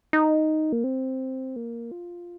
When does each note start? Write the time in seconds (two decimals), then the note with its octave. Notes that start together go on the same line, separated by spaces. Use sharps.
0.13 D#4
0.72 A#3
0.84 C4
1.56 A#3
1.91 F4